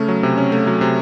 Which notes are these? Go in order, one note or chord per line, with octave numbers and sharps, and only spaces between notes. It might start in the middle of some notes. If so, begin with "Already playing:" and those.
Already playing: C#3 A3 C#4
F#3
C3
C#4
A3
F#3
C3